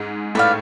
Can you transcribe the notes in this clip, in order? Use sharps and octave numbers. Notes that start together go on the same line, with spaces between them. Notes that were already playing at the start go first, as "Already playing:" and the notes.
Already playing: G#2 G#3
A2 A3 B4 D5 F5